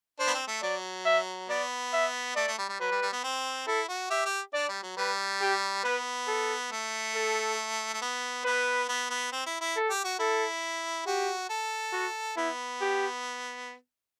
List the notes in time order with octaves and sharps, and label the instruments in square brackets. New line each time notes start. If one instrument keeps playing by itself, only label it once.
[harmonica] D4 [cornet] C5
[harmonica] B3
C4
A3
[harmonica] F#3 [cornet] D5
[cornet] E5
[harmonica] B3 [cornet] D5
[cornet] E5
[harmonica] A3 [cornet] D5
[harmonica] A3
G3
G3
[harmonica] F#3 [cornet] B4
[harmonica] G3
G3
B3
C4
[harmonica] E4 [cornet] A4
[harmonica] F#4
[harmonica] G4 [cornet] E5
[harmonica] G4
[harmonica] D4 [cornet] D5
[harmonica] G3
F#3
[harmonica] G3 [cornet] B4
[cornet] G4
[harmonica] B3 [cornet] B4
[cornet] A4
[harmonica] A3
[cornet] A4
[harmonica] A3
B3
[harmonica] B3 [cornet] B4
[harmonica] B3
B3
C4
E4
E4
[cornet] A4
[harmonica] G4
F#4
[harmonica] E4 [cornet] A4
[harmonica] F#4 [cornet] G4
[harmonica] A4
[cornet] F#4
[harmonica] B3 [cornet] E4
[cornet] G4